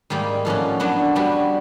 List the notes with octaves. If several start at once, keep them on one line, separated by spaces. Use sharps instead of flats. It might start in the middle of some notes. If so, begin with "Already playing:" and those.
G#2 D#3 G3 A#3
A2 F3 A#3 C#4 F#4
F#3 B3 D4 F#4
G3 B3 D4 F#4